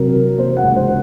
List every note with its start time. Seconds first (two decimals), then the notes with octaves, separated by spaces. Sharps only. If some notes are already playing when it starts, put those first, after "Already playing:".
Already playing: C3 F#3 A#4
0.14 F#3
0.37 A#3 C5
0.57 F#5
0.63 C#2
0.75 C5